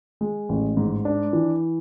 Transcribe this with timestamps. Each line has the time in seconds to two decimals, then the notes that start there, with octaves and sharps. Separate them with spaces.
0.21 G#3
0.49 A1
0.77 G#2
1.05 D4
1.33 E3